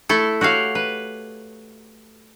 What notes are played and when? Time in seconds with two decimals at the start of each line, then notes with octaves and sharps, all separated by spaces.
0.09 A3 E4 A4
0.41 F#4 G4 C#5 F5
0.75 B4